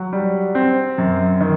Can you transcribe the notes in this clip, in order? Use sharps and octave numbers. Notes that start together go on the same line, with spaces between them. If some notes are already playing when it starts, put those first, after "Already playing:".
Already playing: F#3
G3
C4
F#2
D#3